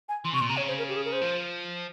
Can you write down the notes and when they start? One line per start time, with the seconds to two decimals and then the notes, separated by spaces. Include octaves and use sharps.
0.09 G#5
0.25 E3 C6
0.33 C3 C#6
0.41 A#2 C6
0.49 C3 A#5
0.57 C#3 C#5
0.68 C5
0.78 A#4
0.89 G4
0.96 G#4
1.05 A#4
1.13 C5
1.22 F3